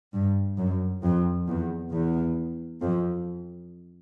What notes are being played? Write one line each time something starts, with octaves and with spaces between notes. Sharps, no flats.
G2
F#2
F2
E2
E2
F2